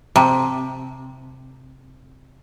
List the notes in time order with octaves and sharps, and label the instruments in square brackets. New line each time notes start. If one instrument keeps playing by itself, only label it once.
[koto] C3 [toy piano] A5 A#5